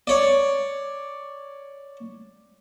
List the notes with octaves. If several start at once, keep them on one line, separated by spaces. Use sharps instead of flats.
C#5 D5